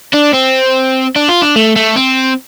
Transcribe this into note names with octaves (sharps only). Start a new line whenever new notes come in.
D4
C4
D4
F4
D4
A3
A3
C4